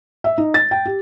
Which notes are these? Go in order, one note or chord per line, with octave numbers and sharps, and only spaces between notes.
E5
D#4
A6
G5
G4